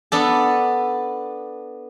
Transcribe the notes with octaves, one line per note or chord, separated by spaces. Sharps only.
B3 D4 A4